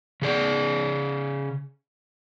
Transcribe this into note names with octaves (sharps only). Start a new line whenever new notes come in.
C#3 G#4 D5